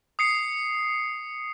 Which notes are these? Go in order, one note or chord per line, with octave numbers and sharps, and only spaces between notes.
D#6 C7 C#7